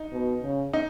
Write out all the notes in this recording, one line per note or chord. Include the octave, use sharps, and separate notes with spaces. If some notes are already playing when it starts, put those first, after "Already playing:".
Already playing: D#4
B2
C#3
D#4